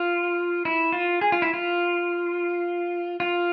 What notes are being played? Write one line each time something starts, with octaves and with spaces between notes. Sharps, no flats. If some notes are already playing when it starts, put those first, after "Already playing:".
Already playing: F4
E4
F4
G#4
F4
E4
F4
F4